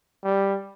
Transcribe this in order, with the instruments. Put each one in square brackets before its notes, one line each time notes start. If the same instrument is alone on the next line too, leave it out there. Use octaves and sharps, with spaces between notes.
[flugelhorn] G3